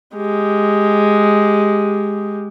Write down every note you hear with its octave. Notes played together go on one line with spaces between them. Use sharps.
G#3 G4